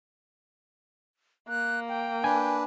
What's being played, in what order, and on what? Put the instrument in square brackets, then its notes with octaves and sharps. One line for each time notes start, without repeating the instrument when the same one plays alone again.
[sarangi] A#3 [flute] F#6
[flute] G5
[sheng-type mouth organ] D4 B4 [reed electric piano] G#5